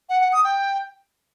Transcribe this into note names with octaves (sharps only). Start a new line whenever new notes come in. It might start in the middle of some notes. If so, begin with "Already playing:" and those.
F#5
F#5
D#6
G5